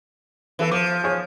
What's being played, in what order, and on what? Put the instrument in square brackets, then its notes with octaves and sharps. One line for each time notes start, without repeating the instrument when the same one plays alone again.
[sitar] E3 [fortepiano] B3 A4 B4
[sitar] F3 [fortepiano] D6
[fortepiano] G#4 C#5